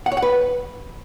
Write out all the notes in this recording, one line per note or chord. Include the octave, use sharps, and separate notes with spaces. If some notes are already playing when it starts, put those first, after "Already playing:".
F#5
C#5
F#5
B4